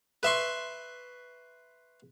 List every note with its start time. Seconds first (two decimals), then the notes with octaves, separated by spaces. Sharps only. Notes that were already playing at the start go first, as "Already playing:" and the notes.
0.23 B4 E5 C6 C#6